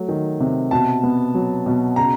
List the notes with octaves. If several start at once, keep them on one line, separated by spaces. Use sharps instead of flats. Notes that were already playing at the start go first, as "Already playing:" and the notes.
Already playing: F#3 A3
D#3
C3
B2 A5
B3
F#3
B2
C#3 A#5